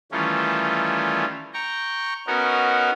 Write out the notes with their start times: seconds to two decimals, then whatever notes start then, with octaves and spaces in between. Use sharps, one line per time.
0.12 D#3 E3 G3 A3 C#4 F4
1.54 G5 A#5 C#6
2.27 B3 C#4 D#4 F#4 A#4